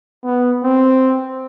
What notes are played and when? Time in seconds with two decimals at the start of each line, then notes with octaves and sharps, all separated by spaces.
0.24 B3
0.63 C4